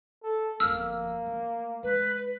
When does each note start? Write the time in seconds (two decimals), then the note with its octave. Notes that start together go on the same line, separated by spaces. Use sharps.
0.23 A4
0.60 G1 F2 A#3 E6 F6
1.26 A3
1.83 G#3 B4